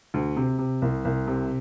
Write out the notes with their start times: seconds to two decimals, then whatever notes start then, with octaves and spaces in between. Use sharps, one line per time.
0.14 D2
0.36 C3
0.59 C3
0.82 C2
1.05 C2
1.27 C3